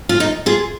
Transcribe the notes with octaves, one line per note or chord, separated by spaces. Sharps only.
F4
D#4
F4 G#4